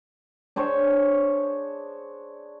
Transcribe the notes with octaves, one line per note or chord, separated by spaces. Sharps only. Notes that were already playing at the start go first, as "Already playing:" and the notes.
D4 G#4 C5 C#5